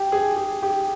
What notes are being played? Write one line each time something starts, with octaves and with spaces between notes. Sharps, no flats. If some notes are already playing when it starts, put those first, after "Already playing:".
Already playing: G4
G#4
G#4
G4